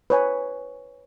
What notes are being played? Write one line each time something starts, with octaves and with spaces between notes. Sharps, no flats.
B4 C#5 G#5